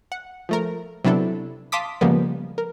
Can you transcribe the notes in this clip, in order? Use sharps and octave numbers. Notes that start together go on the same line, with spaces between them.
F#5
F3 A3 A#4
C3 F#3 B3 D4 E4 A4
F5 A5 C6 D6 D#6 B6
C#3 F3 G3 G#3 A#3 B3
A#4